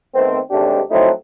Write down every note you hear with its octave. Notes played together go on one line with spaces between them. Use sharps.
D#3 A3 B3 C4
D#2 G#2 C3 A3 D4 G4
F3 F#3 A3 C4 D#4 E4